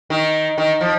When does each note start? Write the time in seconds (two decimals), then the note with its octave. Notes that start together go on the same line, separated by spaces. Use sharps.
0.10 D#3
0.58 D#3
0.81 F3